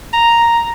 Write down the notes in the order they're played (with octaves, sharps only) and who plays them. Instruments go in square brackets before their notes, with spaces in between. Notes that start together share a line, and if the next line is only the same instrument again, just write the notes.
[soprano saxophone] A#5